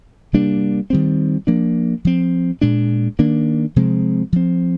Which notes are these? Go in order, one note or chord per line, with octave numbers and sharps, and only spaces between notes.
C3 G3 A#3 D4
D#3 G3 C4
F3 A#3 D4
F3 C4
A#2 G#3 D4
D#3 A#3 D4
C3 F3 G#3 C4
F3 C4